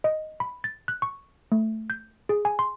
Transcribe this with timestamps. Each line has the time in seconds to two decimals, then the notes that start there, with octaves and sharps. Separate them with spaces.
0.04 D#5
0.40 B5
0.64 A6
0.88 F#6
1.02 C#6
1.52 A3
1.90 G6
2.29 G#4
2.45 G#5
2.59 C6